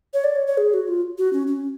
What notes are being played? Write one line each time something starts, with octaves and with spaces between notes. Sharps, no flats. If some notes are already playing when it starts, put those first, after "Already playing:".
C#5
D5
C#5
C#5
G#4
F#4
F4
F#4
C#4
C#4